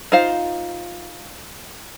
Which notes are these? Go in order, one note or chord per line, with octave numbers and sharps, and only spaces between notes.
D#4 F4 C5 F5